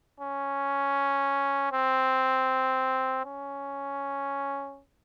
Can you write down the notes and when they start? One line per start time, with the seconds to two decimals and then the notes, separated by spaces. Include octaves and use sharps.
0.20 C#4
1.72 C4
3.25 C#4